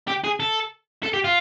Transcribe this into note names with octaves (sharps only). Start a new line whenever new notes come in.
G4
G#4
A4
A4
G4
F4